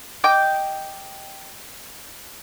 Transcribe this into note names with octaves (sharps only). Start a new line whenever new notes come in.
D#5 G5 D6 G6